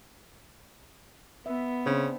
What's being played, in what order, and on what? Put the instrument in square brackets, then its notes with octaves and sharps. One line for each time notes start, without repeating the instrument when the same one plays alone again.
[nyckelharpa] B3 [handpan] E5
[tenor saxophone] C#3 [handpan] C4 D4 C5